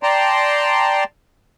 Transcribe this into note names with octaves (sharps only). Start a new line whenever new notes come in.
D5 G5 A5 A#5 C6